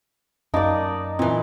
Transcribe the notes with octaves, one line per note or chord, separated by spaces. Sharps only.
F#2 A#3 D#4 D5 A5
A#2 E3 C4